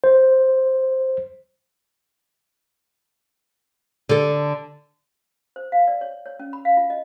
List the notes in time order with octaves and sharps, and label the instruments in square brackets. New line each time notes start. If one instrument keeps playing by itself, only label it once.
[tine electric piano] C5
[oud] D3 A4
[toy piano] C5
F5
D5
C#5
C#5
C#4
B5
F5
F4
D#5